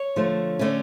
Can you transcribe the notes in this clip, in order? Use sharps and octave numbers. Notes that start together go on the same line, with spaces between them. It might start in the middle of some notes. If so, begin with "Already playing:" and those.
Already playing: C#5
D3 F3 A3
D3 A3 C#4